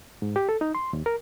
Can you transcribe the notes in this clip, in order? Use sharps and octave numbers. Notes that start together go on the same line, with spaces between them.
G#2
G4
A4
D#4
C6
D#2
A#4